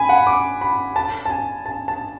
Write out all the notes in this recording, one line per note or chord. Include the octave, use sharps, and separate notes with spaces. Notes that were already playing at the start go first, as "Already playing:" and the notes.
Already playing: G#5 B5
F#5
D6
B5
A5
A5
G#5
A5
A5